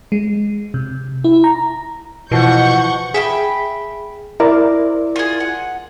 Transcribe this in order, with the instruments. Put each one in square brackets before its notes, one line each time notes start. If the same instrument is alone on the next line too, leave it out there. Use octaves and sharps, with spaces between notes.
[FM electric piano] G#3
C3
E4
A#5
[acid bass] B2 [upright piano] E3 F3 [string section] F#5 C#6 G6
[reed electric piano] G#4 [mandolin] E5 G5 B5
[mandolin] C4 [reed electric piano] E4 A#4 D5
[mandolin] F4 G#4
F#5